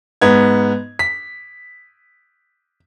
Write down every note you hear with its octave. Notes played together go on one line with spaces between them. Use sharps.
G#2 B3 G#6
B6